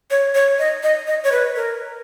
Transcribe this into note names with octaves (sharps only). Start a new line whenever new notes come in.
C#5
C#5
D#5
D#5
D#5
C#5
B4
A#4